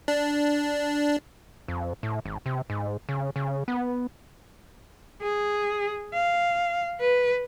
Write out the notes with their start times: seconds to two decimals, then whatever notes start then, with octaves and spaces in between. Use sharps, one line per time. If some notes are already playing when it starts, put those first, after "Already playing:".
0.08 D4
1.68 F2
2.03 A2
2.26 G#1
2.46 C3
2.70 G#2
3.09 C#3
3.36 C#3
3.68 B3
5.22 G#4
6.13 F5
7.00 B4